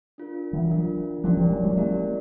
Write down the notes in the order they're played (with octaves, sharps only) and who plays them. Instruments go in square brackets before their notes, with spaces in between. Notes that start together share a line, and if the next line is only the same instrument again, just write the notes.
[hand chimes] D4 F4 A#4
[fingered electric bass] E3 F#3
[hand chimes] D4 F4 A#4
[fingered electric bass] F3 G3 [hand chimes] C#4 E4 G4 A#4 D5
[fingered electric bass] F3 G3
F#3 G#3
F#3 G#3
[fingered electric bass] G#3 A#3 [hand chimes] C#4 E4 G4 A#4 D5